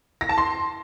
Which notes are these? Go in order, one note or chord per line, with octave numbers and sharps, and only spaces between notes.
A#6
A5
C6